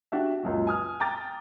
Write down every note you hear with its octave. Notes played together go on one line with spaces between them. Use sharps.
D4 F#4 G4 E5
C#2 F#2 A#2
G#5 D#6 F6
G5 A#5 D6 A6